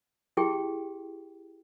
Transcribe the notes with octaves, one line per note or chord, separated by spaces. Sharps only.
E4 G4 G#4 G5